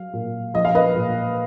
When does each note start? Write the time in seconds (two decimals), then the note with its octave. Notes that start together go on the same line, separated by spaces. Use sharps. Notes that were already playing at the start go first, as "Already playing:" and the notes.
Already playing: F#3 F5
0.13 A#2
0.54 F3 D#5
0.65 F5
0.75 B4 D#5
0.96 A#2